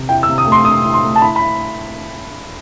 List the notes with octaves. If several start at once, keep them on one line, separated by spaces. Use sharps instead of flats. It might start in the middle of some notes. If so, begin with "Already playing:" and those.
Already playing: C3
E4 G5
E6
C3
D#6
A3
C6
C3 D#6
E4
C6
A3
A5
E4 B5
B5
E4